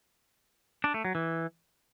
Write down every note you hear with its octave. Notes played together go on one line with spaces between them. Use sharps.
D4
A3
F#3
E3